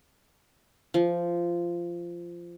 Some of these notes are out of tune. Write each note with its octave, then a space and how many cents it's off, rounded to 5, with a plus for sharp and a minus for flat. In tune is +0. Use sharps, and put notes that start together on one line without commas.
F3 -15